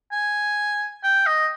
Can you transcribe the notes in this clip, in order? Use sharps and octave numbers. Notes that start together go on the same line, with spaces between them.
G#5
G5
D#5